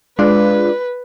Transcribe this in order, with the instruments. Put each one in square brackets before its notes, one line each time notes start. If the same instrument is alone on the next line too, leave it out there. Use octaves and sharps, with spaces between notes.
[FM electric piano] G#3 F4 [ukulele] D4 [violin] B4